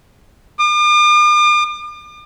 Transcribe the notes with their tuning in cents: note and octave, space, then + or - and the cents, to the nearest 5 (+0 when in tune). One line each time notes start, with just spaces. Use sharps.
D6 +45